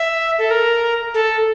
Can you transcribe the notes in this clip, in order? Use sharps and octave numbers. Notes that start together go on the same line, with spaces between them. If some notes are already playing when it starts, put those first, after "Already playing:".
Already playing: E5
A4
A#4
A4